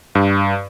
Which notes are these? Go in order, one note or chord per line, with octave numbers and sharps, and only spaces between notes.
G2